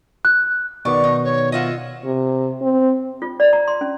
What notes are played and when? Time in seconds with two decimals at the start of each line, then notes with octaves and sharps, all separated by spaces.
0.25 F#6
0.85 B2 D#3 B3 D5 C#6
1.04 D#4
1.24 C#5
1.52 F4 D#5 E5 F#5
2.05 C3
2.62 C4
3.22 F4
3.40 D5
3.53 A#5
3.68 C6
3.81 C#4